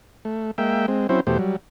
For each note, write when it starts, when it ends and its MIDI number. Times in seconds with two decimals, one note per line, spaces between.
0.25 0.51 57
0.58 0.86 56
0.58 0.86 58
0.58 0.86 76
0.58 0.86 79
0.88 1.07 56
0.88 1.07 60
1.09 1.20 54
1.09 1.20 60
1.09 1.20 61
1.09 1.20 64
1.09 1.20 72
1.27 1.38 40
1.27 1.38 47
1.27 1.38 57
1.27 1.38 67
1.27 1.38 72
1.39 1.56 54
1.39 1.56 55